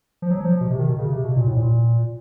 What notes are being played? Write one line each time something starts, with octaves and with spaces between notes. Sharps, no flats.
F3
F#3
F3
B2
C3
D#3
B2
C#3
C3
B2
A#2
A2
A#2